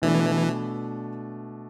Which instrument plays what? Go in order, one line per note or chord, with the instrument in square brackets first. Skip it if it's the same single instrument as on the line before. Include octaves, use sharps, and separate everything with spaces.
[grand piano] B2 A3 D4 [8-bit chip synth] E3